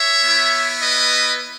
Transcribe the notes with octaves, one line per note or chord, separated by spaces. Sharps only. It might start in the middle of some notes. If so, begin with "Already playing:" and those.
Already playing: C#5 E5
B3 E4
B4 D#5